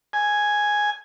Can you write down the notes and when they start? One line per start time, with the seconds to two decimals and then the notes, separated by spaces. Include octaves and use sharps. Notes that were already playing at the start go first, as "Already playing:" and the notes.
0.13 G#5